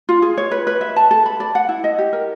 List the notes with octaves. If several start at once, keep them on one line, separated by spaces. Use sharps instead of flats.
F4
G#4
C#5
B4
B4
E5
A5
A4
B5
D5
F#5
E4
D#5
G4
A#4